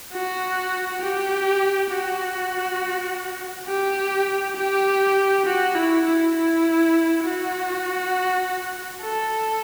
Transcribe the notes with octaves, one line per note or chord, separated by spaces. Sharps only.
F#4
G4
F#4
G4
G4
F#4
E4
E4
E4
F#4
A4